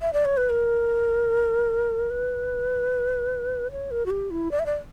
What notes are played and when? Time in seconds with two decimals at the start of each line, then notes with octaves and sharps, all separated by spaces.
0.01 E5
0.13 D5
0.25 C#5
0.37 B4
0.50 A#4
2.10 B4
3.72 C#5
3.91 A#4
4.06 F#4
4.10 G4
4.31 E4
4.51 D5
4.59 E5
4.66 D5